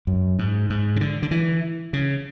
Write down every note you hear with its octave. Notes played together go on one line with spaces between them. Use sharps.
F#2
G#2
G#2
C#3
D3
D3
E3
C#3